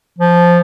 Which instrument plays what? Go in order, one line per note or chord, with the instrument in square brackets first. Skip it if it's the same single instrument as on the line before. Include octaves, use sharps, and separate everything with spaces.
[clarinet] F3